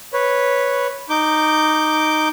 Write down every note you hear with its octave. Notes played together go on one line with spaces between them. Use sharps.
B4 C#5
D#4 D6 G6